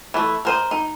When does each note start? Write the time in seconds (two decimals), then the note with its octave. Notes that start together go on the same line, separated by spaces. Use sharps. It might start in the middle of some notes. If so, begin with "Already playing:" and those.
0.14 E3 A3
0.45 A#4 C5 D#5
0.71 D#4